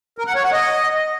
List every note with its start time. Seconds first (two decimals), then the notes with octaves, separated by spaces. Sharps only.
0.18 A#4
0.27 F#5
0.35 C#5
0.44 F#5
0.52 D#5